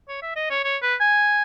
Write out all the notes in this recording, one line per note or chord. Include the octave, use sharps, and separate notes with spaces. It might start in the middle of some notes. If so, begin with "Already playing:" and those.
C#5
E5
D#5
C#5
C#5
B4
G#5